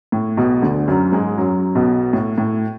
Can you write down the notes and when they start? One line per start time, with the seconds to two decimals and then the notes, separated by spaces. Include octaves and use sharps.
0.12 A2
0.37 B1 B2
0.62 D2 D3
0.87 F#2 F#3
1.12 G#2 G#3
1.38 F#2 F#3
1.75 B1 B2
2.13 A2
2.38 A2